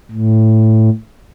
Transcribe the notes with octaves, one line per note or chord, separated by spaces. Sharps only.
A2